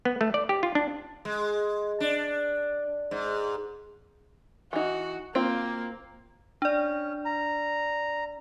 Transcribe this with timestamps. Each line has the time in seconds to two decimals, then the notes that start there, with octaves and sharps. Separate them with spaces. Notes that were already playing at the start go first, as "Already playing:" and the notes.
0.05 B3
0.21 A3
0.34 D5
0.49 G4
0.63 F4
0.75 D4
1.25 G#3
2.00 D4
3.11 G#2
4.73 E3 D#4 F#4
5.35 A#3 C4 F4
6.62 C#4 D4 D5
7.25 A#5